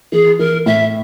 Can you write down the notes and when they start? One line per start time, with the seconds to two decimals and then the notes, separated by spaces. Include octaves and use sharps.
0.12 E3 G#4
0.39 E3 A#4
0.66 A2 E5